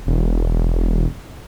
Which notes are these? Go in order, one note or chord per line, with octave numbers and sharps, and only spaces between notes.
E1